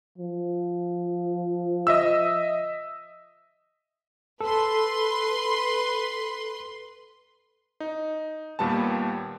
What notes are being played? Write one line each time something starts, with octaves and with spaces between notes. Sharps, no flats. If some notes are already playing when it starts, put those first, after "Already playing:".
F3
D#5 E5 E6
A4 B4 C6
D#4
D#2 A#2 G3 B3 A5